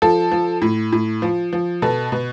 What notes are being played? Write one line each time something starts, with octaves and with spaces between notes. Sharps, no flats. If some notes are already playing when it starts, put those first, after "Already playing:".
F3 A4
F3
A2
A2
F3
F3
B2 A4
B2